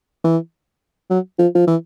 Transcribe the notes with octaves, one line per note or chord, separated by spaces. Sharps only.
E3
F#3
F3
F3
E3